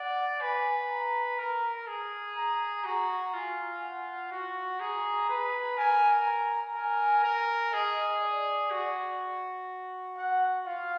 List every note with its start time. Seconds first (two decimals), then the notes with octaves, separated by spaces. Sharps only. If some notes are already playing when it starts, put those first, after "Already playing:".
Already playing: D5 F#5
0.40 B4 G#5
0.90 A#5
1.38 A#4 A#5
1.88 G#4
2.36 A#5
2.84 F#4 A#5
3.34 F4 G#5
3.82 F#5
4.31 F#4
4.80 G#4 A#5
5.29 B4
5.77 A#4 G#5
6.26 A#5
6.75 A#4 G#5
7.24 A#4
7.73 G#4 D#5
8.22 D5
8.71 F#4
10.17 F#5
10.66 F4 F5